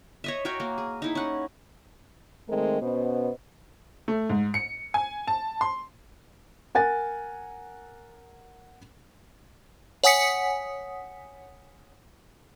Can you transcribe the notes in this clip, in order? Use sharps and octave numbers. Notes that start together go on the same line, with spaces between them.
C#5 D#5 E5
F#4 A#4 C#5 G5
A#3
G#4
D#4 E4
C#4 F#5
D#3 G#3 A3 C4 A#4
B2 B3 C#4 B4 C5 D#5
A3
G#2
C#7
G#5
A5
C6
A#4 F#5 G#5 A6
C#5 F#5 G#5 D#6 B6 C#7